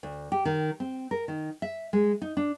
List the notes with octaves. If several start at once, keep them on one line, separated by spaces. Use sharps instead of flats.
D2
G4
D#3
C4
A#4
D#3
E5
G#3
D#4
D4